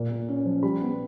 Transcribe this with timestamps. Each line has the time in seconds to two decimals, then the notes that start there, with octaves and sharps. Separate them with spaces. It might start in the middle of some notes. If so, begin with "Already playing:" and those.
Already playing: A#2 A#3
0.11 A#3
0.29 C#4
0.45 F3
0.63 G3 B5
0.81 B3